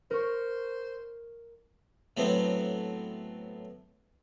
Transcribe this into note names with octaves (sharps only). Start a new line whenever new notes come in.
A#4 C5 C#6
A2 F#3 A3 B3 C4